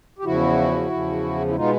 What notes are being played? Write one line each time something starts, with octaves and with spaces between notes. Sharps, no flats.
G4
E2 C#3 F3 E4 F#4
E2 C#3 F3
E4
B2 G#3 B3 D#4 F4